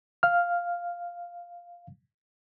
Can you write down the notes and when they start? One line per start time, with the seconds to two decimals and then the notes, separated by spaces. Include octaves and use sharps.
0.23 F5 F6